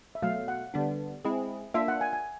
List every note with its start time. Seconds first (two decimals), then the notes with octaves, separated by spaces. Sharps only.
0.15 E5
0.22 B2 F#3 A3 F5
0.48 F#5
0.74 D3 G3 B3 D4
1.25 G#3 C4 E4 G#4
1.74 A#3 D4 F4 E5
1.88 F#5
2.01 G#5
2.13 G#5